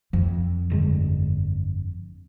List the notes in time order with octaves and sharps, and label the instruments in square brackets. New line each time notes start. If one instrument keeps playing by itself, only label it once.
[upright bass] F2 [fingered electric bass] F3
[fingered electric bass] G1 D3 G#3